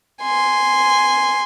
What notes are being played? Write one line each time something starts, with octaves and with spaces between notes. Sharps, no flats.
G#5 C6